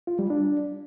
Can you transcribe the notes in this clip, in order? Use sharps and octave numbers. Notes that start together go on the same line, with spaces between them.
F4
G3
D4